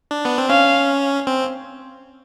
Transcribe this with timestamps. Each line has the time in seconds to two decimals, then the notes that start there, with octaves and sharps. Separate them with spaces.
0.11 D4
0.25 B3
0.38 C4
0.50 C#4 F5
1.27 C4